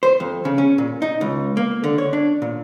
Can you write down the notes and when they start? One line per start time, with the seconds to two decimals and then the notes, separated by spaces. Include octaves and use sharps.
0.03 C5
0.20 F2
0.45 C#3
0.58 C#4
0.78 A#2
1.02 D#4
1.21 C#2
1.57 A#3
1.84 D3
1.98 C#5
2.13 D4
2.42 A#2